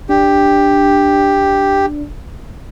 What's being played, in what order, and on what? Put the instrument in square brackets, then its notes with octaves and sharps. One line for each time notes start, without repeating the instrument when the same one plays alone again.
[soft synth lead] D4 [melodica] G4